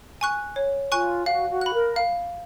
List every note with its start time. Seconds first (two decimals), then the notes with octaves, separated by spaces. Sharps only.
0.21 G#5 C#6 F#6
0.56 C#5
0.92 F4 G#5 C#6 F#6
1.26 F#4 F5
1.50 F#4
1.61 B5 F#6
1.73 A#4
1.96 F5